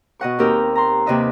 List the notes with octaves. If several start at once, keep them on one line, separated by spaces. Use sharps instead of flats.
B2 D#5 F#5 C#6
D#2 C4 D#4 G4 A#4 E6
A#5 C6
D#2 C3 B4 D#5 E5